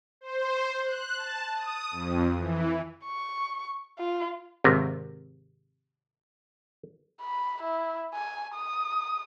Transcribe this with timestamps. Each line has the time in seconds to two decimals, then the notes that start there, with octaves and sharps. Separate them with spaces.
0.21 C5
0.83 F#6
1.16 A5
1.54 D#6
1.91 F2
2.36 E3
3.05 C#6
3.98 F4
4.64 G#1 C3
7.21 B5
7.62 E4
8.14 G#5
8.55 D#6